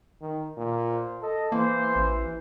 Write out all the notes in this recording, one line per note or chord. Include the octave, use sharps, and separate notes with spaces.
D#3
A#2
C5
A4 D#5
E3 A#3 C5
A1